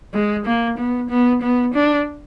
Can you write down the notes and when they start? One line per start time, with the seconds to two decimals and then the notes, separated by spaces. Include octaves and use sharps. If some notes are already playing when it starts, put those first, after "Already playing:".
0.14 G#3
0.45 A#3
0.77 B3
1.10 B3
1.42 B3
1.74 D4